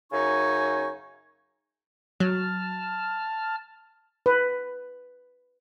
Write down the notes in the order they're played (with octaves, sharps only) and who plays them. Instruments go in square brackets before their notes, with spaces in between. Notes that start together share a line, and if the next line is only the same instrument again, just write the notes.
[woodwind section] F#2 C#3 D#4 G#5 C#6
[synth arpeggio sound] F#3 [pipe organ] A5 F6
[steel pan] B4